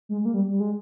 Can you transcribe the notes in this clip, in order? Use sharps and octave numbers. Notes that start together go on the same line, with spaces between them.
G#3
G#3
A#3
G3
G3
G#3